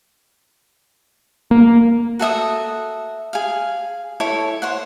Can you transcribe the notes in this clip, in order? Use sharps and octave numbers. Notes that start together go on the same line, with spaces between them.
A#3
F#4 A4 E5 D#6
G#4 F5
E4 A4 C#5
C5 C#5 F#5